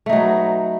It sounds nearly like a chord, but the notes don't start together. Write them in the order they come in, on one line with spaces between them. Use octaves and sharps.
A3 D#4 F#3 B3